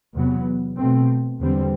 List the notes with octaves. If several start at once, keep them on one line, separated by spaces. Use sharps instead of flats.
E2 C3 F#3 B3
B2 A3 C4
E2 D3 G3 C4